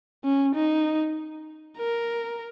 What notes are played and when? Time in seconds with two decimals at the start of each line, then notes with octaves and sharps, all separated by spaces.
0.24 C#4
0.55 D#4
1.77 A#4